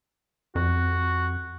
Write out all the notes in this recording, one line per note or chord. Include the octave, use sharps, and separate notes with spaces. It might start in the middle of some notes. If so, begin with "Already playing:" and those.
F2 F#4